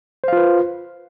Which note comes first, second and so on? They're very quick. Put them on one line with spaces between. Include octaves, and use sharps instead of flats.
C5 F5 F4 B4